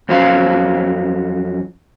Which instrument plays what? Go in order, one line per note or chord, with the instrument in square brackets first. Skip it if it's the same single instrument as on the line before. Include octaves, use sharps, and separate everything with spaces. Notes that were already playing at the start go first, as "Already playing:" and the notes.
[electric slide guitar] F2 F#3 C#4 C5 F5